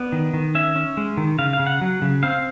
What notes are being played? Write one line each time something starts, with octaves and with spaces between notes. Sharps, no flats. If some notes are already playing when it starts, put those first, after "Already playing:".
Already playing: B3 D5
D#3
D#3
C#4 E5
C#4
G#3
D#3
C#3 F5
F5
C#3
F#5
F#3
C#3
C4 F5